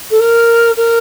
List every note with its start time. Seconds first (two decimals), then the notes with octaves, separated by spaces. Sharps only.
0.10 A4
0.19 A#4
0.77 A#4